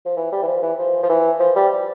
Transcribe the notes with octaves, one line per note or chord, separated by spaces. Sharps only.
F3
E3
G3
E3
F3
E3
F3
F3
E3
F3
G3